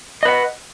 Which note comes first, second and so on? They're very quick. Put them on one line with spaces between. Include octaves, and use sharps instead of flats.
D#5 B4 F#5